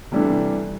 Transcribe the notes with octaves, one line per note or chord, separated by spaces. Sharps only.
C3 E3 G3 D4 A4